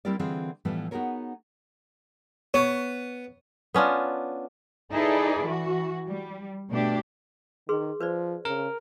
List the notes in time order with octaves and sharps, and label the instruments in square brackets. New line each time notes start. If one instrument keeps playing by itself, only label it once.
[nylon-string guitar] G3 C4 E4 G4 A#4 D5
D3 E3 C4 F4 G#4
A2 E3 F3 G3 A3 B3
B3 D#4 F#4 G#4 A#4 C#5
[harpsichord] B3 [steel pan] C#5
[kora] B3 C#4 D4 F4
[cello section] D#4 E4 G#4 A4 B4 D5
E3 F#4
G3
B2 A3 D4 G4
[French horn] D#3 [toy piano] G#4 B4 C6
[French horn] F3 [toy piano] B4 C5 D5
[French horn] C#3 [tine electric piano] A#4